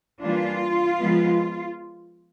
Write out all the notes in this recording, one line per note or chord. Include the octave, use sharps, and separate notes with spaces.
E3 G3 A#3 D4 F4
F3 G#3 B3